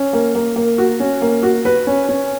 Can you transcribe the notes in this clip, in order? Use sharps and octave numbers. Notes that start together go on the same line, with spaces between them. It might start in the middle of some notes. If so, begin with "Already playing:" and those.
Already playing: C#4
A#3
A#3
A#3
F#4
C#4
A#3
F#4
B4
C#4
C#4